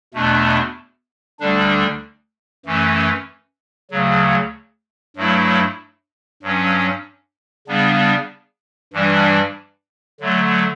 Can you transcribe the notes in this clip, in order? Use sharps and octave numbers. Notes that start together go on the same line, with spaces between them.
E2 B2 A3 D4
D2 D3 G3 D4
F#2 E3 A3 C#4
D2 C#3 F#3
G2 F#3 A3 E4
G2 F#3 C#4
C#3 G3 B3 D4
G2 E3 G3 D4
D3 F#3 A3